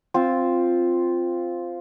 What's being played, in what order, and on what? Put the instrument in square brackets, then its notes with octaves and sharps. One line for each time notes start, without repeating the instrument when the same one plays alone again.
[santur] C4 F4